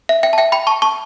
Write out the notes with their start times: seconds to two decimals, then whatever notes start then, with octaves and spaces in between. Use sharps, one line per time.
0.09 E5
0.23 E5 G5
0.33 A5
0.38 E5 G5
0.52 G5 B5
0.67 A5 C#6
0.82 A5 C#6